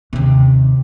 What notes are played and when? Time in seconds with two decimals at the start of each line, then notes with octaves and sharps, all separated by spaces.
0.13 D#2 C3